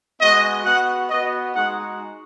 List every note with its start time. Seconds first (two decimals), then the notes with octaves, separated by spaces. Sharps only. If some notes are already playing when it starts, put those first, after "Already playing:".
0.21 G#3 B3 F#4 D#5
0.65 B3 F#4 F#5
1.10 B3 F#4 D#5
1.55 G#3 D#4 F#4 F#5